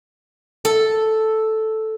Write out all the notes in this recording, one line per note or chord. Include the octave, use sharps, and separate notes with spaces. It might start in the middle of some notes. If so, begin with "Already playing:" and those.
A4